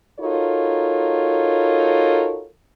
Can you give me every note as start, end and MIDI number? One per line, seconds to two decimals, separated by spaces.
0.20 2.45 63
0.20 2.45 65
0.20 2.45 66
0.20 2.45 69
0.20 2.45 70
0.20 2.45 73